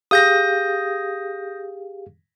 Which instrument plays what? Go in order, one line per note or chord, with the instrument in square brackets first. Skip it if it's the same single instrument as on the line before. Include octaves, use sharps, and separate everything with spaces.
[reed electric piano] G4 G#4 F5 [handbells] D#6 G6 A#6